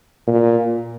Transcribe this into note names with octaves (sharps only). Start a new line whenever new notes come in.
A#2